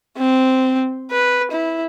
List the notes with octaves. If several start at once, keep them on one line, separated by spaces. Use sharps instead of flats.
C4
B4
E4